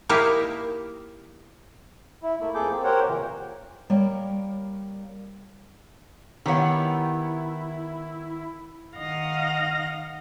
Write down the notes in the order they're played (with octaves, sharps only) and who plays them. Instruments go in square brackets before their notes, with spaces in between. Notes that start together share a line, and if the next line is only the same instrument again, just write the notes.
[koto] A#3 D#4 E4 G4 E5 F5
[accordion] E4
A3 A#3 E4
F2 A#3 G#4 A4 D6 G6
A#3 C4
G4 A#4 C5 C#5 F#5 G5
A#2 C#3 E3 A#3
[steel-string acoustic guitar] G3 A#3 A#4 C#5 G5
[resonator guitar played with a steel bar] D#3 B3 [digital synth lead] E4 [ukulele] G4 C#5 F#5
[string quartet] D#3 D#5 F5 F#5 A#6